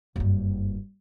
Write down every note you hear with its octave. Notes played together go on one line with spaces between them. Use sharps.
F#1 G2